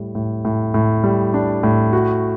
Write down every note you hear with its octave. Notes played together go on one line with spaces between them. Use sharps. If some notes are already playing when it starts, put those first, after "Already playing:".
Already playing: A2 G3
A2
A2
A2
G3
D4
A2
F#4